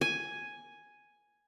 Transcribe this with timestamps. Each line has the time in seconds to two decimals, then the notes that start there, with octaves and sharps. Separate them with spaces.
0.01 G#5